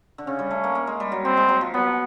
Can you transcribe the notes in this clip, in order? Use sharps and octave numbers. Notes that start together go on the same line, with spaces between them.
D3
C#3 C#4
G3
A3
A#3
A#3
G#3
G3
F#3
G3 C4
G#3
F#3
F3
F#3 B3